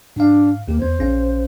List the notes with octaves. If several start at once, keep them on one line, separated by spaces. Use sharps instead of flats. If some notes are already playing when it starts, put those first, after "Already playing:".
G#2 D4 F5
D#2 A#3 G4
E2 B3 C5
A#1 C#4 F5